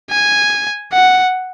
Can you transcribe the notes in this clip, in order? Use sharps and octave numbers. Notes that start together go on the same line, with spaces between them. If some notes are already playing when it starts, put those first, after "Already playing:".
G#5
F#5